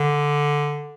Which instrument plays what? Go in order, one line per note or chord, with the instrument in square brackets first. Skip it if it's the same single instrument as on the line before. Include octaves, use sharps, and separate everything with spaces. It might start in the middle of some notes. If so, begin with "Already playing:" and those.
Already playing: [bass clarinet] D3